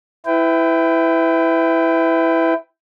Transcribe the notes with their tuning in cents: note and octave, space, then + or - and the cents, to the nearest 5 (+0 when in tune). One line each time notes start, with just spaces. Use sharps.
E4 +0 B4 +30 G5 +0